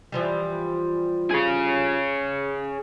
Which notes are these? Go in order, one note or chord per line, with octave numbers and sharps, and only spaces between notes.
E3 F3 G3
G#4 C#5